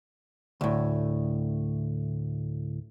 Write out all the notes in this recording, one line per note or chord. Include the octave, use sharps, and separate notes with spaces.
D2 A2